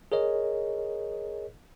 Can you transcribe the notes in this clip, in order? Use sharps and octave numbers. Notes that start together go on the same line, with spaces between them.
G#4 A#4 C#5 D#5